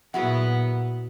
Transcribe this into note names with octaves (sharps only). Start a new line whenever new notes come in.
A#2 F#3 B3 E4 F#4 G#4 F#5